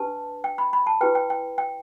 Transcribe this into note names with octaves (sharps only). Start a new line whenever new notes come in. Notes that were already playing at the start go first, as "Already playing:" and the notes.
Already playing: D4 G4 B4 A5
G5
B5
B5
A5
E4 G4 B4 G5
G5
G5
G5